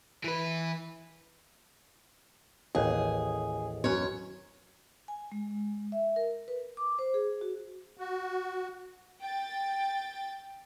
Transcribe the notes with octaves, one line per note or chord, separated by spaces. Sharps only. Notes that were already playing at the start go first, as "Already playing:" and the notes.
E3 B4
A1 D#2 G#4
F#2 C#5
G#5
G#3
E5
A#4
B4
D6
C5
G#4
F#4
F#4
G5 A6